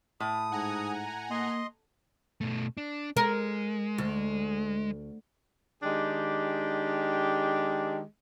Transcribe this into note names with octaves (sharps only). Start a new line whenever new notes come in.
A2 D#6
G#2 F#5 G#5 A#5
A#3 D#5 C6
B2 A3
D4
G#3 A#4
D2
D#3 G#3 D4 G4